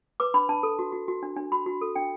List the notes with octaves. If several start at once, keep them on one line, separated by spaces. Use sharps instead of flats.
B4 D6
D4 B5
D4 A5
A4
F#4
F#4
F#4
D4
D4
F#4 B5
F#4
A4
D4 G5